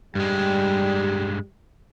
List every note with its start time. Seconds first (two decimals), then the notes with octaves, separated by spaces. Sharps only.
0.15 G2 G3 G#3 G4